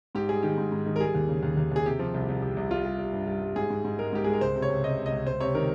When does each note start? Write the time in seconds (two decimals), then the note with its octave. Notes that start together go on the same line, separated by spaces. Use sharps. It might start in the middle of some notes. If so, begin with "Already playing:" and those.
0.15 G#2 G4
0.29 G3 G#4
0.43 D#3 G4
0.58 G#2
0.72 G#2
0.86 D#3
0.96 A#4
1.00 G3 G#4
1.15 D#2
1.29 C#3
1.43 D#2
1.57 D#2
1.72 D#2 G#4
1.85 C3 G4
1.99 F3
2.14 C2
2.29 C2
2.42 C3
2.57 C2
2.71 G3 F4
2.85 G3
2.99 G3
3.13 G2
3.27 G3
3.42 G3
3.56 G#2 G#4
3.70 G#2
3.85 G#2
3.99 G#3 A#4
4.13 G#2 G4
4.24 G#3 G#4
4.33 A#4
4.41 C#2 C5
4.56 C3
4.62 C#5
4.70 C#2
4.84 C3 D#5
4.98 C#2
5.06 D#5
5.12 C#2
5.27 C#2 C5
5.40 C3 C#5
5.55 D#3 A#4